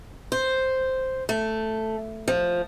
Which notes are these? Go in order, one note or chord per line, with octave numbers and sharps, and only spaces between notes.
C5
A3
F3